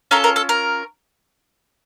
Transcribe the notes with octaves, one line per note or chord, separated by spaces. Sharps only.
C#4 F4 A4 A#4
A#4
A4
A#4